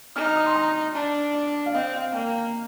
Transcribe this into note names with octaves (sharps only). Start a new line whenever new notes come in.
D#4 F6
F6
D#6
C6
A#5
D4 A5
D5
F5
C4 D#5
F5
A#3 G5